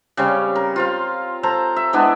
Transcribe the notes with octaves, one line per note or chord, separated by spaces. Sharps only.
C#3 G3 C4 C#4
A#4
F4 C5 F5
A4 C5 A5 A#5
E5
G#3 B3 D4 E4